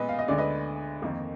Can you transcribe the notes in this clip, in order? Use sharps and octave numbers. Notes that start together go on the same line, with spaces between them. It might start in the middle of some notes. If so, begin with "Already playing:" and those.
Already playing: A#2 G#3 B3 B4 D#5
F5
D#5
D2 D3 G#3 D5
B4 D#5
F2 D#3 A#3 D#4